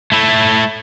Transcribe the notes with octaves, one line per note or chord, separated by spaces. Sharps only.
A3 E4